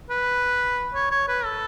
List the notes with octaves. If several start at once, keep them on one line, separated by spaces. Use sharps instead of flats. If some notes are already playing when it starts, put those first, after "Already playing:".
B4
C#5
C#5
B4
A4